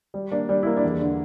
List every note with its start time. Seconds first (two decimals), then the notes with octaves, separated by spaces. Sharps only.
0.14 G3
0.32 A#3 D4
0.49 G3 D4
0.63 A#3 E4
0.77 D4
0.84 E2
1.01 D3